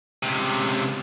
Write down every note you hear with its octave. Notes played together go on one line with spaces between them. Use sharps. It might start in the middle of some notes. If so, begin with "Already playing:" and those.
C#2 C3